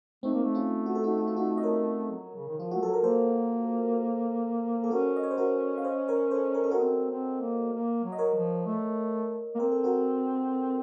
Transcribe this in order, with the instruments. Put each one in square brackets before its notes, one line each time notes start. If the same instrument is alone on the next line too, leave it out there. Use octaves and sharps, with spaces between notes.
[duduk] A3 [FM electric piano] C4 D#4
[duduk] A#3
A3
[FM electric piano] C#4 F4
F#4
A4
D#4 F#4
F#4
F4
D#4 F#4
D#5
A#4 C#5
[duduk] F#3
C#3
D#3
[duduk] F3 [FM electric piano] F4
[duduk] A3 [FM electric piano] F#4
[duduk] F#3 [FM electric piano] A4
[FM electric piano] A#4
[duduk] A#3 [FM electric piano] A4 C5
[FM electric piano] A4
[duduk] C#4 [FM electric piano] F#4 A#4
[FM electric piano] D#5
C#5
C5
F#4 A#4
F5
C5 D#5
A#4 C#5
A4 C5
A#4
A4
F#4 A#4
[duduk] C4
C4
A#3
A#3
F#3
[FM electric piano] D#5
A#4 C#5
[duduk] F3
A3
A#3
[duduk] C4 [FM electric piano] A#4
[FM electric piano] A4
F#4 A#4